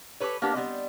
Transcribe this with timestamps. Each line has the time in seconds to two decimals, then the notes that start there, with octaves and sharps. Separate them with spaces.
0.20 G4 A4 B4 C#5
0.42 A#3 B3 D4 G4 A#4
0.54 G3 B3 C4 D#5